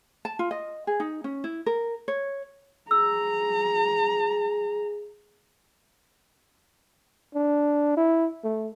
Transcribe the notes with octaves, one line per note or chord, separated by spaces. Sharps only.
A5
F4
D#5
G#4
D#4
C#4
E4
A#4
C#5
G#4 A#5 E6
D4
E4
A3